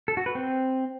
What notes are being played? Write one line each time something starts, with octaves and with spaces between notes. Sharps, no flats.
A4
F#4
B4
C4